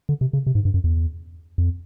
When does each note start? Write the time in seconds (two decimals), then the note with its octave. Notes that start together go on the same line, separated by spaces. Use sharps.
0.09 D3
0.21 C3
0.33 C#3
0.47 C3
0.55 G#2
0.65 G2
0.74 F#2
0.84 E2
1.58 F2